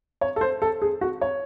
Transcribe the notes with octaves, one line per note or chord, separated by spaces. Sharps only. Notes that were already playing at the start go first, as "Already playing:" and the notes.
C#5
A4
C5
A4
G#4
F#4
C#5